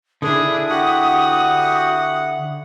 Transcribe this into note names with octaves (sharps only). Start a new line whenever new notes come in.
D3 D4 E4 G#4 D#6
F#4 G4 F#5